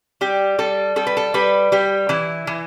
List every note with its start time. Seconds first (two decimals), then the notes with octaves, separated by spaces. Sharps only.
0.21 G3 G4
0.59 G3 A4
0.96 G3 A4
1.07 B4
1.17 A4
1.34 G3 B4
1.72 G3 G4
2.09 E3 E4
2.47 E3